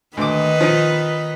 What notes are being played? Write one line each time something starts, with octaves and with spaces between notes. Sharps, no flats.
D2 D#3 B4 D#5 D6
F3 D#4